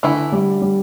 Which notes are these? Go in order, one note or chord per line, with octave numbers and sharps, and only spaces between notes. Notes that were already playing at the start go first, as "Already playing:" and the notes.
D3 E3 A3 E4
G3
G3